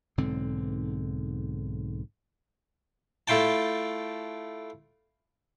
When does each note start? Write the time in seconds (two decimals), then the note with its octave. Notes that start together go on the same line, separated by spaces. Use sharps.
0.18 B1 G#2 D3 C4
3.28 A3 E4 F4 G5 A5